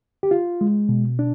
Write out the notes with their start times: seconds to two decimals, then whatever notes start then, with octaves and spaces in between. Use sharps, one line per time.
0.23 G4
0.31 F4
0.61 G#3
0.89 B2
1.19 D4